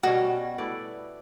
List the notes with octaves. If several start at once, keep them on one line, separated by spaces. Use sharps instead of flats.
B2 G3 C#4 F#4
A3 E4 B4 D5